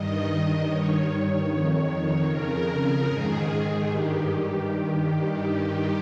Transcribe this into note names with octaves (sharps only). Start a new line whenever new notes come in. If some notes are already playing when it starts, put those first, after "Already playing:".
Already playing: G2 D#3 D#5
G2 D#3 C#5
F2 D#3
F2 C#3 A#4
G#2 D#3 G#4
G2 D#3 G4